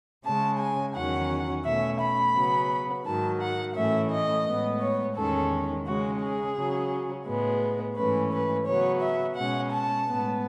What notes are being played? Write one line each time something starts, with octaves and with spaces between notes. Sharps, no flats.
C#3 G#3 C#4 A5
G#5
E2 D#3 F#3 C#4 F#5
B2 A3 C#4 E5
B5
C#3 F#3 B3
G#2 D#3 F#3 A5
F#5
A2 E3 A3 C#4 E5
D#5
A2 G#3 B3
C#5
E2 D#3 G#3 C#4 A4
C#3 G#3 C#4 F#4
G#4
C#3 F#3 C#4
A2 G#3 B3
G#2 E3 A3 C#4 B4
B4
C#3 F#3 B3 C#5
E5
B2 G#3 C#4 F#5
A5
A2 G#3 B3